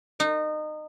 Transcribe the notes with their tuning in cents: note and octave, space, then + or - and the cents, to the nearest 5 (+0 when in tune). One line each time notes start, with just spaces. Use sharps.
D#4 -25